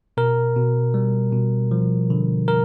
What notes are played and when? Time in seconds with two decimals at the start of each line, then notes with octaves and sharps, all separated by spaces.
0.17 B2 A#4
0.56 B2
0.94 G3
1.32 B2
1.71 F3
2.10 D3
2.48 A#4